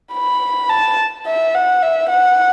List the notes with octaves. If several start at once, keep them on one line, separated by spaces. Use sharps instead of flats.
B5
A5
E5
F#5
E5
F#5